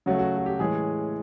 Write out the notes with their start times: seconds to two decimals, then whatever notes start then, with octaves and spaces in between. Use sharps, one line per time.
0.06 C#3 F#3 A3 F#4
0.19 F#4
0.37 F#4
0.46 G4
0.59 A2 E3 G#3 G#4